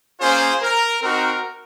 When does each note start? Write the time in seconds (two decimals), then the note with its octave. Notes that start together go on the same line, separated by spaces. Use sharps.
0.20 A#3 C#4 F4 G#4 C5
0.62 A#4
1.02 C4 D#4 F#4 A#4